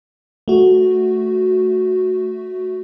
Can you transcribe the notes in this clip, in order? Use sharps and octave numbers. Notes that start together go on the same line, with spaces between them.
A3 F#4